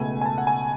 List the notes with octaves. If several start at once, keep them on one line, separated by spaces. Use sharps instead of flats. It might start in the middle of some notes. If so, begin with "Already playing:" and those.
Already playing: C#2 B2 A3 G#5
G#5
A5
F#5
G#5